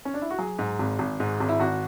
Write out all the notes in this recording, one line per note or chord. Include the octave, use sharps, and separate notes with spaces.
C#4
D4
E4
F#4
F#3 G#4
G#2
G#1
G#1
G#2
G#1
E4
G#1 F#4